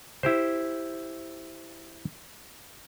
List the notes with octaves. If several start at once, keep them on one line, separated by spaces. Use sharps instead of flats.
E4 G4 C5